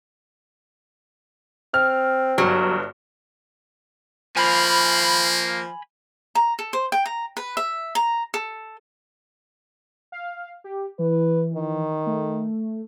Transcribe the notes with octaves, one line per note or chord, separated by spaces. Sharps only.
C4 F6
G1 G2 F#3
F3 A#3 G#5 B5
A#5
A4
C5
G5
A#5
B4
E5
A#5
A4
F5
G4
E3 B4
D#3
A3